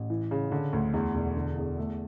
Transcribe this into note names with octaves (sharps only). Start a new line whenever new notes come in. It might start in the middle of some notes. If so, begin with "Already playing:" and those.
Already playing: A1
E3
C#3
D3
D2
E2
E1
D3
E2
A3